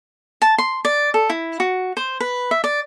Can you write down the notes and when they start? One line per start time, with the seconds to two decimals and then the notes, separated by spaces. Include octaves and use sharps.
0.42 A5
0.58 C6
0.85 D5
1.14 A4
1.30 E4
1.60 F#4
1.97 C5
2.20 B4
2.51 E5
2.64 D5